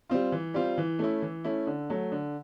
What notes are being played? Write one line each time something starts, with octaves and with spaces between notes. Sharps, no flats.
G3 C4 F4
E3
G3 C4 F4
E3
A3 C#4 E4
E3
A3 C#4 E4
D3
F#3 A3
D3